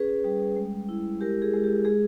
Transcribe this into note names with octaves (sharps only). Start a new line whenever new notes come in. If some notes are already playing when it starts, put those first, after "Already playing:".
Already playing: C#4 G#4 B4
G3
G#3
E4
G#3 G4 A#4
G#4
G#3
G4
G#3 G#4